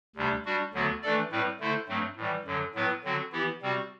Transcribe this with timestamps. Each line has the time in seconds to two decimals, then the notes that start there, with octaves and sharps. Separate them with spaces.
0.16 D2 C3 G3 D4
0.45 G3 D4 F#4
0.73 D2 D3 F#3 B3 F#4
1.02 E3 A3 D4 A4 D5
1.31 A2 G3 C4 E4 B4
1.60 D3 A3 E4 A4 C5
1.88 G2 F#3 A3 C4
2.17 A2 E3 G3
2.45 F#2 D3 F#3
2.75 A2 F#3 B3 E4 B4
3.04 D3 F#3 C4 F#4
3.32 E3 B3 E4 G4
3.61 C3 G3 C4 F#4